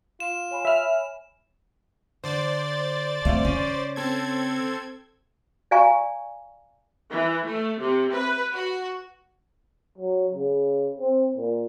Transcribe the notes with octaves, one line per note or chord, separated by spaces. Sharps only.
F4 E7
C#5 G#5 B5
E5 F6
D3 C5 D5 A6
C3 A3 F5
C#3 C#4
C4 A4 G#6
D5 F5 G#5 A#5 C#6
E3
A3
C3
B4
F#4
F#3
C#3
C4
A#2